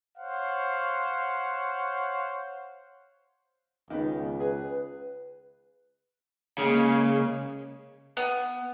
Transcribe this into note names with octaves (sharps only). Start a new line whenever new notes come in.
C5 C#5 F5 F#5
C#2 D#3 B3
G#4 B4
C#3 G#3 A#3
B3